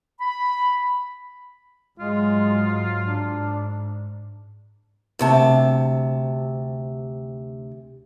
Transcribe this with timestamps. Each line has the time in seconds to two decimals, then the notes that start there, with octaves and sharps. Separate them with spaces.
0.20 B5
1.99 G#2 F#3 G#3 F4
3.06 G#2 D4
5.19 D2 C3 A5